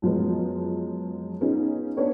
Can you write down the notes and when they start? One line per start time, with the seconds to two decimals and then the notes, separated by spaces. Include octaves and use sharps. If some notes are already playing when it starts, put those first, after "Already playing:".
0.02 F#2 F3 G#3 B3
1.41 B3 C#4 D#4 F4 G#4
1.97 B3 D4 B4 C#5 D5